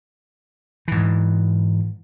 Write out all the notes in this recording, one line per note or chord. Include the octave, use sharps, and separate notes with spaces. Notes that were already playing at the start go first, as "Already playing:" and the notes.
G#2 E3